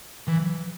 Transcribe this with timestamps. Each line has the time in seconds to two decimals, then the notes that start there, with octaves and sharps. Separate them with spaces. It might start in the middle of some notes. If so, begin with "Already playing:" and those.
0.28 E3